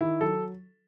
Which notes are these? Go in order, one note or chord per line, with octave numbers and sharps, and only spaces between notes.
D#3 E4
F#3 A4